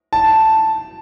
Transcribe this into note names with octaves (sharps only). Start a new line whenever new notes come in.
A5